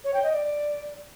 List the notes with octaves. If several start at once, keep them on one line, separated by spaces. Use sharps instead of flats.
C#5
G5
D#5
D5